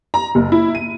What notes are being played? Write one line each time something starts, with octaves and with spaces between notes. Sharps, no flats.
A#5
F#1
E4
D#7